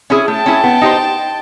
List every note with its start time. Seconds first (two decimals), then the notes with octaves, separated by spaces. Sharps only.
0.10 C#4 E4 G#4
0.27 A3 G5 A5
0.46 C#4 E4 G#4
0.64 B3
0.82 D#4 G4 C5